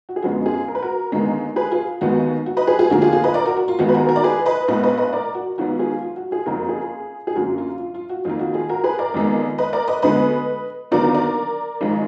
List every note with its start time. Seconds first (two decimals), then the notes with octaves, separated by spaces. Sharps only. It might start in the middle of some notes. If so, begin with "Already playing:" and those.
0.09 F#4
0.16 G#4
0.23 F#2 D3 F3 G#3 B3 F#4
0.46 F4 G#4
0.68 A#4
0.75 B4
0.83 F#4 A#4
1.12 D#2 D3 G#3 B3
1.56 G#4 B4
1.72 F4 G#4
2.01 D#2 D#3 G#3 B3 F#4
2.46 F#4
2.57 B4 D#5
2.67 G#4 B4
2.79 F4 G#4
2.90 D2 D3 F3 A#3 F#4
3.01 F4 G#4
3.13 F4 G#4
3.24 B4 D#5
3.34 A#4 D5
3.46 F#4 A#4
3.57 F#4
3.68 F4
3.79 D#2 D#3 G#3 B3 F#4
3.89 B4
3.94 F#4 A#4
4.09 F#4 A#4
4.16 D5
4.23 G#4 B4
4.46 B4 D#5
4.68 A#1 A#2 G#3 B3 B4 D#5
4.83 B4 D#5
4.97 B4 D#5
5.13 A#4 D5
5.35 F#4
5.58 G#1 G#2 F#3 B3 F#4
5.79 F4 G#4
6.02 F4
6.16 F#4
6.31 F4 G#4
6.46 F#1 F2 F3 F#4 A#4
6.69 F4 G#4
7.27 G#4
7.35 F#2 D3 F#3 A#3 F#4
7.58 F4
7.80 F4
7.94 F4
8.10 F#4
8.25 F2 D#3 A#3 F4
8.39 F#4
8.54 F4 G#4
8.69 F#4 A#4
8.84 G#4 B4
8.99 A#4 D5
9.14 F2 D#3 G#3 B3
9.58 B4 D#5
9.73 A#4 D5
9.88 B4 D#5
10.02 D2 D3 G#3 B3 B4 D#5
10.91 D#2 D3 F#3 B3 A#4 D5
11.14 A#4 D5
11.81 G#1 G#2 F3 G#3